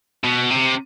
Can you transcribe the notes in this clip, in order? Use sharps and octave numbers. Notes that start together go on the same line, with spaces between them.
B2
C3